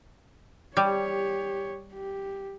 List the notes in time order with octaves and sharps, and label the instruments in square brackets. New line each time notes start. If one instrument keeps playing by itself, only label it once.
[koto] G3 [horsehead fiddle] G4 C#5
[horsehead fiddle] G4